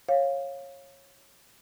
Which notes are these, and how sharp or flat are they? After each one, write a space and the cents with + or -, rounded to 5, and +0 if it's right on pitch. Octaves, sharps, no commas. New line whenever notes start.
C#5 -20 F5 +0